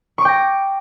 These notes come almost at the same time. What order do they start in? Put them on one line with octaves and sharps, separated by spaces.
C#6 D6 G5 A#6